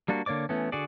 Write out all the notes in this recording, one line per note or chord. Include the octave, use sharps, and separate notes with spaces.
G3 A#3 D4 F#4
D3 A#3 C#5 D5 D6
E3 A3 B3 C#4
D3 F#4 G#4 D5